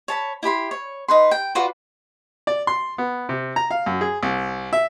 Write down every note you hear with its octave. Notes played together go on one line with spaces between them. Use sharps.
C#5 A5 B5
E4 G4 B5 C6
C#5
D#4 B4 C6
G5
F4 F#4 B4 D5
D5
C6
B3
C3
A#5
F5
F#2
G#4
C2
E5